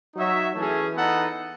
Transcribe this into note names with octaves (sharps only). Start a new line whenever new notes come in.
F#3 D#4 F#4 C#5 E5
E3 A3 C#4 G#4
B3 D#4 A4 D#5 F#5